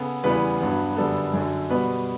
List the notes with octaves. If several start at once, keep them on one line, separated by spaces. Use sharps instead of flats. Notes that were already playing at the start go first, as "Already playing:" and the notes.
Already playing: C#3 B3 A4
E2 C#3 E3 G3 B3 B4
G2 F#3 B3
F#2 D3 G3 B3 A4
F#2 D3 F#3
B2 G3 B3 B4